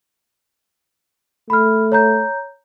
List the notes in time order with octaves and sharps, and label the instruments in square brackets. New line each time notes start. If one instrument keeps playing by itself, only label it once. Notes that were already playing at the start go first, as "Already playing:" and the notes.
[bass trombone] A3 [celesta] B5 F6
[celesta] C#5 A#5 G6